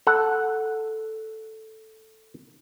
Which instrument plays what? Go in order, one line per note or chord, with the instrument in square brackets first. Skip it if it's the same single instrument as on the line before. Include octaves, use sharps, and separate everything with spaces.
[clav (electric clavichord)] A4 F#5